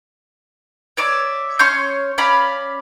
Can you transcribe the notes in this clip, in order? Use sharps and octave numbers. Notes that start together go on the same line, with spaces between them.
C#5 D5 E5 D6
C#4 C#5 C6 G6
C#4 D5 F5 B5